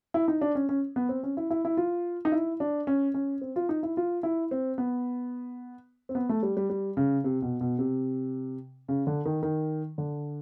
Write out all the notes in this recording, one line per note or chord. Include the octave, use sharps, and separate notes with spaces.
E4
D#4
D4
C#4
C#4
B3
C4
C#4
E4
E4
E4
F4
D#4
E4
D4
C#4
C#4
C4
F4
D#4
E4
F4
E4
C4
B3
C4
B3
A3
G3
G3
G3
C#3
C3
B2
B2
C3
C#3
D3
D#3
D#3
D3